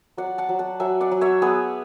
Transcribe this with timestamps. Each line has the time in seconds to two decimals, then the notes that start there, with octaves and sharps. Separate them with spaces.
0.17 F#3 D5 F#5
0.38 F#5 A5
0.49 F#3
0.59 F#5 A5
0.80 F#3 E5 G#5
1.01 D5 F#5
1.11 F#3
1.21 C#5 E5
1.42 B3 G#4 B4